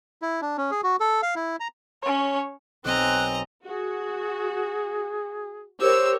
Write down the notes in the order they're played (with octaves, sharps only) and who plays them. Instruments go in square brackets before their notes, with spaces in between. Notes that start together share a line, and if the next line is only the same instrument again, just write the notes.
[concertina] E4
D4
C#4
G#4
F#4
A4
F5
E4
A#5
[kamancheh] C#4 C#5
[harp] B1 G#5 [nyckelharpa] C4 [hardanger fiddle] D#5 A#5 [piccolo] F#6
[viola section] F#4 [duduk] G#4
[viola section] G4 A#4 C#5 [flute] C5 [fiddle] E6